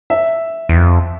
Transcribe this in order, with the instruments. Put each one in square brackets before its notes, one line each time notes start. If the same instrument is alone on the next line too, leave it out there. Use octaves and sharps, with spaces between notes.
[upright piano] E5
[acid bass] E2
F2